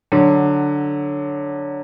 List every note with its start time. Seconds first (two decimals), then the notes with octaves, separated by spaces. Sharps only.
0.12 D3 F#3